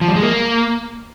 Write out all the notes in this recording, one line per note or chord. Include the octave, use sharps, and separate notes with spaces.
F3
G3
G#3
A#3